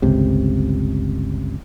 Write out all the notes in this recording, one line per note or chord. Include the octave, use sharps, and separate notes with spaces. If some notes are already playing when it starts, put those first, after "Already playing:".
G1 C#2 C3